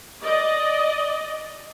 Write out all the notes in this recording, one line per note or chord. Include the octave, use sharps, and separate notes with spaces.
D5 D#5